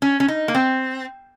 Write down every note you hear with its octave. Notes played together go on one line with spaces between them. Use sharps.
C#4
C#4
D#4
A#3
C4